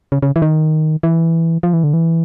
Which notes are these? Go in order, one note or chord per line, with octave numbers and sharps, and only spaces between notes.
C#3
C#3
E3
D#3
E3
F3
E3
D3
E3